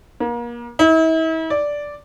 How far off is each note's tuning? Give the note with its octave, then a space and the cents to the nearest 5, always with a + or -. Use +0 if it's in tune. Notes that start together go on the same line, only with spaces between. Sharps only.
A#3 +35
E4 -40
D5 -5